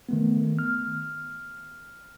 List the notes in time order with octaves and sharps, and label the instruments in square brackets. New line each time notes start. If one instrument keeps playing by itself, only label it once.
[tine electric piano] D#3 A3 B3
F6